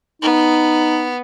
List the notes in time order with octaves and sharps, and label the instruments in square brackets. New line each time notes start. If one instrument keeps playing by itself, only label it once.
[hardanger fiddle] B3 [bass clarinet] D#4